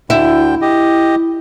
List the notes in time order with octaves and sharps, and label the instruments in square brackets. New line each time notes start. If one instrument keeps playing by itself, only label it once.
[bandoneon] D2 D3 G5 [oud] E4
[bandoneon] G4 D#5